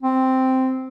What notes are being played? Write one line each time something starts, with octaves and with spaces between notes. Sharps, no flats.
C4